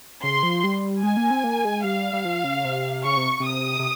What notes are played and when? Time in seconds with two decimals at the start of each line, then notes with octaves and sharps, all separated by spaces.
0.23 C#3 C6
0.43 F3
0.64 G3
1.03 G#3 G#5
1.17 A#3
1.31 C4
1.44 A#3
1.65 G#3
1.84 G3 F5
2.13 G3
2.25 F3
2.44 C#3
2.64 C3
3.05 C#3 C#6
3.16 C3
3.40 C3
3.46 D#6
3.79 C3